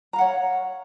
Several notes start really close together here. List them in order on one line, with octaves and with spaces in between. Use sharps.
A#5 F5 F#5 C#5